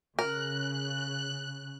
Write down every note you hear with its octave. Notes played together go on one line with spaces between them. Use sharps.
C#3 A#4 F#6